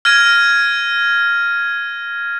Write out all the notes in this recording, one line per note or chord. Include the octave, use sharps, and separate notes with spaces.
F6 G#6 A#6 D#7